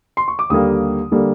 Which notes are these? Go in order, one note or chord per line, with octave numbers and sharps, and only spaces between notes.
C6
C#6
D6
D#2 D3 G3 A#3 D#6
D3 G3 A#3